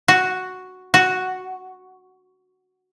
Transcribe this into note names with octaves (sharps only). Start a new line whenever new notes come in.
F#4
F#4